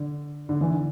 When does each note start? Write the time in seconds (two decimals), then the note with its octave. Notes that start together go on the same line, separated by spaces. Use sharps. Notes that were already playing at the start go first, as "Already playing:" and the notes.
Already playing: D3
0.49 D3
0.61 E3
0.72 D3